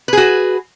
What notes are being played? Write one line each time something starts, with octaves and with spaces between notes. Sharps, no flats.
F#4 G#4 B4